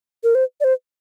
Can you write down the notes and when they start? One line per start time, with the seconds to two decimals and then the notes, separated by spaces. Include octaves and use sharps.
0.24 A#4
0.35 C5
0.60 D5
0.64 C5